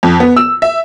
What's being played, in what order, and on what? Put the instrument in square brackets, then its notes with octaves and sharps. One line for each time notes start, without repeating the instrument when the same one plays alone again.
[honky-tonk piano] F2
B3
E6
E5